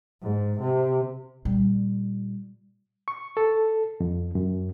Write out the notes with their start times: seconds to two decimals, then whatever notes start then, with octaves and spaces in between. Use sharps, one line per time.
0.22 G#2
0.60 C3
1.45 A#2 G3
3.08 C#6
3.37 A4
4.00 F2
4.35 F#2